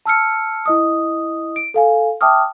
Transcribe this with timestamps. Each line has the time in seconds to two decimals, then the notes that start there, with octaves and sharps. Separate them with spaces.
0.06 A5 E6 F6 C#7
0.66 E4 D#5 D#6
1.56 D7
1.74 A4 F5 G#5
2.21 E5 G5 A5 D6 D#6 F6